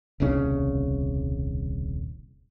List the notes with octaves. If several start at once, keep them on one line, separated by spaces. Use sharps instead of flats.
D#1 C2 C#3 C#4